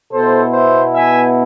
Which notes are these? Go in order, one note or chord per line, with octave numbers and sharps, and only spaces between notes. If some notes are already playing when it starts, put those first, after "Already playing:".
B2 B3 E4 A4 C5
C5 E5
E5 G#5